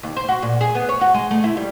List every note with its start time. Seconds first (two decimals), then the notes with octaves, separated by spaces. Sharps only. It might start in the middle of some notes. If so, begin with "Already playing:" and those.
0.03 D#2
0.16 C5
0.29 F#4
0.42 A#2
0.61 G#4
0.75 B3
0.89 C#5
1.01 F#4
1.14 G#3
1.31 A3
1.44 E4
1.57 G3